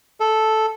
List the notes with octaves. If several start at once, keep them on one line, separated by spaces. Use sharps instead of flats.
A4